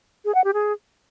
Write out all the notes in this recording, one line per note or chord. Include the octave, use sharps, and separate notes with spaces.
G#4
F#5
G4
G#4